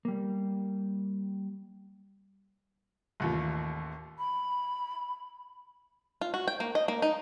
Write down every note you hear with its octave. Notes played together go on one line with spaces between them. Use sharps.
G3 A#3
A1 D#2 F4
B5
F4
F#4
G5
A#3
D#5
A#3
D#4